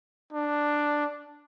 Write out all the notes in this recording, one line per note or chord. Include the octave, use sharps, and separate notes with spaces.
D4